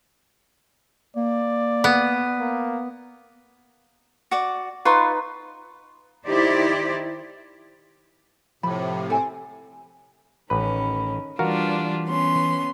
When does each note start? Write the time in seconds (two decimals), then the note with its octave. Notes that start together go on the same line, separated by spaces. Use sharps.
1.16 A#3 D5
1.84 B3
2.40 A#3
4.31 F#4 D5
4.85 D#4 F4 B4 C6 C#6
6.27 D#3 D#4 E4 G4 C5 D5
8.63 A2 C3 F3 B5
9.10 C4 A4 G#5
10.50 A1 D#3 C#4 B4 B5
11.39 E3 G3 D4 F4 F#4 A#4 F5
12.07 B3 C#4 C6